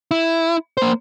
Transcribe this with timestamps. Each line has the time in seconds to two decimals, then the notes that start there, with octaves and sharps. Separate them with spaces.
0.11 E4
0.77 A#3 C5